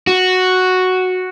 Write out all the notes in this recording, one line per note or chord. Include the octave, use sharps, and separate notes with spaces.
F#4